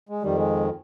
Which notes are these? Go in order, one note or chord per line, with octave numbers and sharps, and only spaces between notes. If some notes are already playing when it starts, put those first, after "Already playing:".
G#3
F2 D#3 G3
G#3